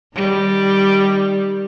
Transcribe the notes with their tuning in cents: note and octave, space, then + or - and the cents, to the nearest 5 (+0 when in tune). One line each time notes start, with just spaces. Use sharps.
D#3 +0 G3 +0